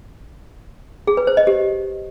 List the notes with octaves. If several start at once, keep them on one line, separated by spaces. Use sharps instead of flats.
G#4
B4
C5
D#5
G4